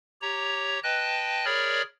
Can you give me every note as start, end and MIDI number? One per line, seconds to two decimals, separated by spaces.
0.22 0.80 67
0.22 0.80 73
0.22 0.80 82
0.84 1.45 71
0.84 1.45 75
0.84 1.45 79
0.84 1.45 81
0.84 1.45 90
1.45 1.82 68
1.45 1.82 70
1.45 1.82 73
1.45 1.82 74
1.45 1.82 83
1.45 1.82 89